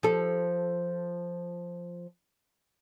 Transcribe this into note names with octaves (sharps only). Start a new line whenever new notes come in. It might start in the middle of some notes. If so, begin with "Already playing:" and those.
F3 A4